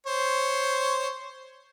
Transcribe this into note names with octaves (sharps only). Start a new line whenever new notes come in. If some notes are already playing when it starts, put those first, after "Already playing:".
C5 C#5